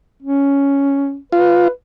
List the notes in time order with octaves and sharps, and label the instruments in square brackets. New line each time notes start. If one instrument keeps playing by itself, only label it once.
[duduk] C#4
[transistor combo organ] F4 [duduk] B4